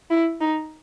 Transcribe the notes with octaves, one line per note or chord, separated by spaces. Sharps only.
E4
D#4